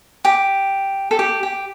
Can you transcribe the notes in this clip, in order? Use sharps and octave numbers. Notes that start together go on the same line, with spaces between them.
G4
A4
G4
G4